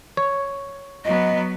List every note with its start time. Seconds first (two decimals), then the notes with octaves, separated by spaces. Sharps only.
0.17 C#5
1.05 F#3 B3 D#5